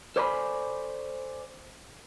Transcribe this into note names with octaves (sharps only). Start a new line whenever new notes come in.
A4 C5 D5 G#5 A5 B5